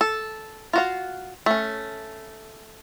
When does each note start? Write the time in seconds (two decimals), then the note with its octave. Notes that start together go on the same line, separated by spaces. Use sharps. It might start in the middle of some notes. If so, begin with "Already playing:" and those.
0.01 A4
0.73 F4 F#4 F5
1.46 A3 C#4